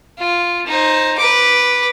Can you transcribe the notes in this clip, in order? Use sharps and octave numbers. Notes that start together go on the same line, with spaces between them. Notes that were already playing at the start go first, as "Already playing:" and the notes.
F4
D#4 C5
B4 D6